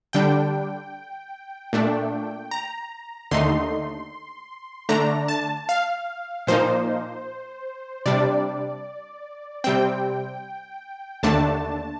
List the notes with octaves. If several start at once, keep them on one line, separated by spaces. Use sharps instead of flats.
D3 G3 D4 G5
A#2 A3 D4
A#5
D#2 D3 A3 D#4 C6
D3 A3 D4 A#5
A5
F5
A#2 F3 A#3 D#4 C5
C3 G3 D4 D5
C3 G3 C4 G5
D#2 D3 A3 D4 A5